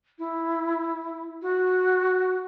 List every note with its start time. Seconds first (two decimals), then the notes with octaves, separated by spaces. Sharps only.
0.18 E4
1.42 F#4